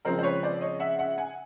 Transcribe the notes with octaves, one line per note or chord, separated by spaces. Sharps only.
C#3 F3 G#3 C4 A#4 C5
C5
B4 C#5
C5 D5
C#5 D#5
E5 F#5
E5 F#5
F#5 G#5